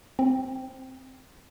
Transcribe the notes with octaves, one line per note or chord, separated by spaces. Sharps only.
C4